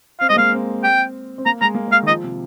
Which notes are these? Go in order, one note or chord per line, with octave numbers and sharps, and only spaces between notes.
C4 F5
G#3 D#5
A#3 F5
C4
G5
C4
A#3 A#5
G#3 A#5
A#3
G#3 F5
D#3
F3 D#5
C3